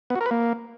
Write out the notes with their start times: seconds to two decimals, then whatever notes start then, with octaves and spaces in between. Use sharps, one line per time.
0.10 B3
0.15 F#4
0.21 A#4
0.26 B4
0.31 A#3